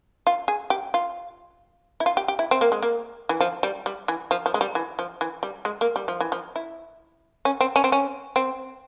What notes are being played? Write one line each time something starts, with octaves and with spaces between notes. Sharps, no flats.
F4
G#4
G4
F4
E4
F4
G4
G4
E4
C4
A#3
G#3
A#3
E3
F3
G3
G3
E3
F3
F3
G#3
G3
E3
F3
E3
G3
G#3
A#3
G3
F3
E3
F3
E4
C#4
C4
C#4
C4
C#4
C4